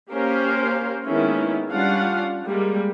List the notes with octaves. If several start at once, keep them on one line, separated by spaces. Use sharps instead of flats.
A#3 C#4 G4 A#4 C5 F5
D#3 G#3 A#3 B3 C#4 E4
G3 C#4 D4 F4 F5 F#5
G3 G#3 A#3